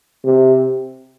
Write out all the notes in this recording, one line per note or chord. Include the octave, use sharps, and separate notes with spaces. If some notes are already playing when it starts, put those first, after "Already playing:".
C3